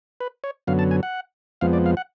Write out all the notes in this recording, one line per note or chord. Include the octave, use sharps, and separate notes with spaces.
B4
C#5
F#2 D3 F#3 B3 F5
A5
G#5
F#5
F2 F3 G#3 B3 F5
D5
F5
F#5